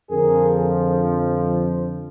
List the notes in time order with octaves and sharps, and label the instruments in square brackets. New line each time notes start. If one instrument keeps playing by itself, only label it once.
[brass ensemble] F2 D3 F3 G#4 A#4